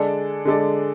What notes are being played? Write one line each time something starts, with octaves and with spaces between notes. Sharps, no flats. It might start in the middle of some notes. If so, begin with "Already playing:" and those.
Already playing: D3 G#3 D4 A4 D5
D3 G#3 D4 A4 D5